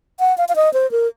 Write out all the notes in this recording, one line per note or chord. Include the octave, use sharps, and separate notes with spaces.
F#5
F5
F5
D#5
C5
A#4